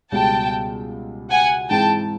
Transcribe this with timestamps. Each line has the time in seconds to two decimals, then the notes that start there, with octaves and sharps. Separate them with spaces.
0.11 C#2 B2 G3 G5 A5
1.30 F#5 G#5
1.70 G#2 E3 G#3 C4 E4 G5 A5